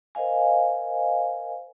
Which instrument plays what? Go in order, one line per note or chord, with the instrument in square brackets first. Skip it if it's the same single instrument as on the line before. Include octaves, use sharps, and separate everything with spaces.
[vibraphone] A#4 C5 D#5 F5 G#5